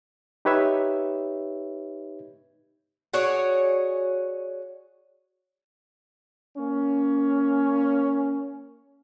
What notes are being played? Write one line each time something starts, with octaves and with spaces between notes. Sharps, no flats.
D#4 G4 B4 C#5 E5
F#4 G#4 C#5 D5
A#3 C#4